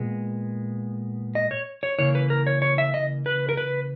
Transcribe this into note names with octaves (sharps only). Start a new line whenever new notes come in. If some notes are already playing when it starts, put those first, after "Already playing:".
Already playing: A#2 G#3 B3
D#5
C#5
C#5
C#3 E3 A#3 C#5
B4
A#4
C#5
C#5
E5
D#5
B4
A#4
B4